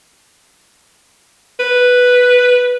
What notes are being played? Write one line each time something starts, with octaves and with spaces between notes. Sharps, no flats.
B4